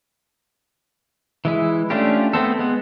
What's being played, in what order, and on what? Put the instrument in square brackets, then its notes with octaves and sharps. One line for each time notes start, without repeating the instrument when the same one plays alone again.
[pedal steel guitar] E3 G#3 E4
A3 C#4 D4 F4 G4
A3 B3 C4 A4
G#3 B3